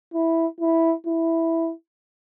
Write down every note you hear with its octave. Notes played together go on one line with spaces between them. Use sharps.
E4
E4
E4